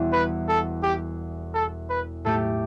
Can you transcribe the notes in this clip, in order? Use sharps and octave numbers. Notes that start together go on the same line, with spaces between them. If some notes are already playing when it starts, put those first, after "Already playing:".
Already playing: E1 E2 E3 G3
B4
A4
G4
A4
B4
A2 A3 G4 A4